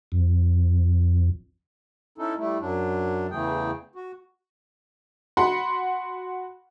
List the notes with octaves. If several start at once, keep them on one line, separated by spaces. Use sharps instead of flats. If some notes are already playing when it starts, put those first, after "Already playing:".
F2
C#4 D#4 E4 A4
G3 A3 E4
F#2 F#3 D4
E2 C#3 E3 A3 G#4 G5
F#4
F#4 F#5 B5 C6